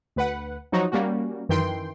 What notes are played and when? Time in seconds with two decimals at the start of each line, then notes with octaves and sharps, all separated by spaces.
0.16 D2 B4 F#5
0.72 F3 F#3 D#4 F#4
0.92 G3 A#3 C#4 F#4
1.49 F#2 D#3 E3 G5 C6